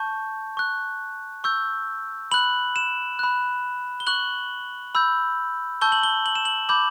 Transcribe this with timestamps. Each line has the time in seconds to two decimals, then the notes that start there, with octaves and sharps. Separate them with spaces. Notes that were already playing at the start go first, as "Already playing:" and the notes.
Already playing: A5 C#6 G6
0.57 C#6 F#6
1.44 C#6 E6 G6
2.32 B5 F#6 F#7
2.76 E7
3.19 B5 F#6
4.00 G7
4.07 C#6 F#6 F#7
4.95 B5 E6 G6
5.81 A5 C#6 E6 G6 G7
5.92 F#7
6.03 G7
6.26 F#7
6.35 E7
6.45 F#7
6.69 B5 D6 G6 F#7